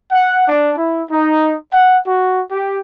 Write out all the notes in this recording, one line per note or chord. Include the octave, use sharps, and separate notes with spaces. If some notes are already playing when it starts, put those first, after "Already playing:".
F#5
D4
E4
D#4
F#5
F#4
G4